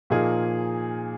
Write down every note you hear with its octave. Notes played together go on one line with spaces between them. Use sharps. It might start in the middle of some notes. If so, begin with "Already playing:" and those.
A#2 F3 A#3 D#4 G#4